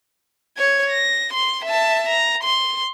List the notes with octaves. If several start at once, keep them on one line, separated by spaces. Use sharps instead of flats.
C#5 G#6
A#6
C6
E5 A5
A#5
C6